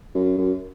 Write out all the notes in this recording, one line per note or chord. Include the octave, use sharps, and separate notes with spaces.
F#2
F#2